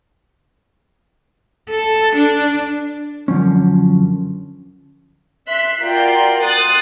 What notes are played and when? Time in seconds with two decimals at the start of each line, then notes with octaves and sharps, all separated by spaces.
1.69 A4
2.15 D4
3.28 F#2 B2 D3 F3 C#4
5.47 E5 C6 F#6 B6
5.81 F4 F#4 A#4 D5 G5 C6
6.40 C6 D#6 F#6 A6